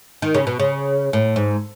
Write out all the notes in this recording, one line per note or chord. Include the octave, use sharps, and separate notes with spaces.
D#3
C#3
B2
C#3
A2
G#2